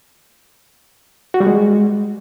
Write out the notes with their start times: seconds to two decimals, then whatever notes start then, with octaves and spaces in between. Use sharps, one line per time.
1.34 F#4
1.40 G3
1.47 G#3